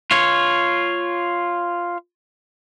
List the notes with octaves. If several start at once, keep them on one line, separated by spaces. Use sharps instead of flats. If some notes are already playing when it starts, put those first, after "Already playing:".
F4 C#5